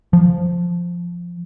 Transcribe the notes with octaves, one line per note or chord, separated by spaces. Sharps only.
F3